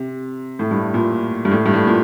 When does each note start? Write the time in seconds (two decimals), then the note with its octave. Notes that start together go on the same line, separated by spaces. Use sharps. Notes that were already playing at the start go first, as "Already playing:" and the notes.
Already playing: C3
0.59 A2
0.71 G2
0.94 A#2
1.45 G2
1.51 A2
1.66 G2
1.74 A2
1.87 A#2